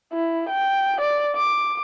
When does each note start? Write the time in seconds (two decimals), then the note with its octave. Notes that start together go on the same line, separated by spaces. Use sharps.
0.13 E4
0.50 G5
1.01 D5
1.36 D6